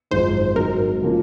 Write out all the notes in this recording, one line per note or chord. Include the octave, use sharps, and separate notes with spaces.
G#1 F#2 F3 G#3 D#4 C5
G#2 F#3 C4 D#4 A#4
C#3 F3 A#3 C#4